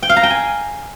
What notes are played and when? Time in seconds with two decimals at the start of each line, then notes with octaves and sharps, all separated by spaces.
0.02 G5
0.09 F5
0.16 A#5
0.23 G5
0.30 G#5